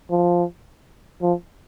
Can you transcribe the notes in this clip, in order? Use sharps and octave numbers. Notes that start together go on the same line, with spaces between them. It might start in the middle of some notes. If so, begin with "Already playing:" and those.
F3
F3